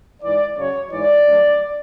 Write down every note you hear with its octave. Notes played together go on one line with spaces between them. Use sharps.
G#2 E3 D5
F#2 C#3 F#3 C#5
G#2 E3 D5
D2 D3 F#3